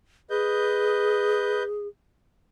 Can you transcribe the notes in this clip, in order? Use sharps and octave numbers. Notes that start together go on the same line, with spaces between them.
G#4 B4 D#5 G6